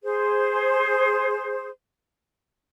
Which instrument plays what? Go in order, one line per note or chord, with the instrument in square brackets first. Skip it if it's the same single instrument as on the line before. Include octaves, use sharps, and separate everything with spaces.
[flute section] G#4 C5